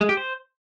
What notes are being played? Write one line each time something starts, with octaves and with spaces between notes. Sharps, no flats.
G#3
G4
C5